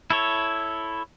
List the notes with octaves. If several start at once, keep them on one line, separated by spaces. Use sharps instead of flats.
E4 A4 C#5